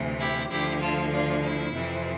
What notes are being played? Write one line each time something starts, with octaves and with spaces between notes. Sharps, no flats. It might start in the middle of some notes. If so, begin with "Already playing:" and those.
Already playing: D2 C3 E3
E4 G4
D2 D3 F3 E4 G4
F4 A4
D4 F4
E4
F2 C3 E3